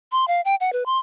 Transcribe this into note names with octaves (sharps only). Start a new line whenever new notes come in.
C6
F5
G5
F#5
B4
C6